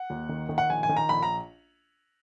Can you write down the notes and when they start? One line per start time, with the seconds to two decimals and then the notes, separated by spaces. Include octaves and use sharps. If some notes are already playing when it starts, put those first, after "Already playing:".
Already playing: F#5
0.10 D#2
0.29 D#3
0.49 D#3
0.58 F#5
0.70 A#1 G#5
0.83 G#5
0.89 D#3
0.97 A#5
1.09 A#1 B5
1.23 A#5